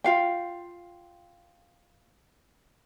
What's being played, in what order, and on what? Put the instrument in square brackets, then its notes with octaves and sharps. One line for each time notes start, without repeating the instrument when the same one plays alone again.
[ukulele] F4 F5 G5